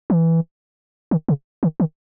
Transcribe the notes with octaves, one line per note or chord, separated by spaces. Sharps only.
E3
D#3
C#3
D#3
D#3